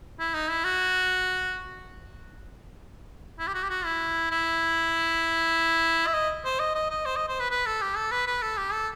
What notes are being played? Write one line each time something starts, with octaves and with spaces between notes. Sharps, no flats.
E4
D#4
E4
F#4
E4
G4
F#4
G4
F#4
E4
E4
E5
D#5
C5
D#5
D#5
D#5
C5
D#5
C5
B4
B4
A4
G4
A4
B4
B4
A4
G4
A4